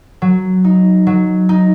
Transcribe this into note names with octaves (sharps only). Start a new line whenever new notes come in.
F#3
D#4
F#3
D#4